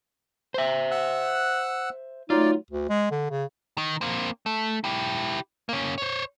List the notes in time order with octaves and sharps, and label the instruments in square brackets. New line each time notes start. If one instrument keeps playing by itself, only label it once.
[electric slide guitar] C5 E5
[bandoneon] F#5 E6 F#6
[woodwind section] F#3 A3 D#4 [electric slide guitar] F4 [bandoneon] D5
[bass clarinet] D2
G#3
D3
C#3
[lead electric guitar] D#3
A#3 C4
A3
E4 G4
A#3 C#4
C5 C#5